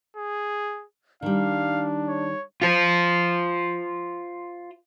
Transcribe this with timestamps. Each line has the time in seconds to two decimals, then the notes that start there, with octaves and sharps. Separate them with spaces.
0.17 G#4
1.22 D#3 G3 D4 F5
2.08 C#5
2.62 F4 C5